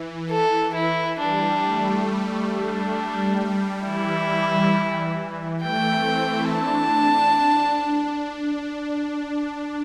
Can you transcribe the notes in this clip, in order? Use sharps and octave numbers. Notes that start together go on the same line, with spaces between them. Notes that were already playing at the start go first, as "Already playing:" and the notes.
Already playing: E3
A4
E4
G3 D4
A3
A3
G3 D4
G3
G3
E3 E4
A3 G5
C4
E4
D4 A5